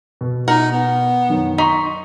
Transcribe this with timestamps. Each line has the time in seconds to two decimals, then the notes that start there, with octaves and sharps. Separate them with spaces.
0.21 B2
0.48 D#4 A#4 F#5
0.72 B3
1.29 F#2 D#3 C#4
1.58 D#4 C6 C#6 B6